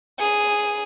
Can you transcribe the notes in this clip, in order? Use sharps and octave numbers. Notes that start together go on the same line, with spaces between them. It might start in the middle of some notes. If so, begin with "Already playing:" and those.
G#4 D#7